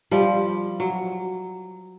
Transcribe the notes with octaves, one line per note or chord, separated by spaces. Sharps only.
F3 G3
F#3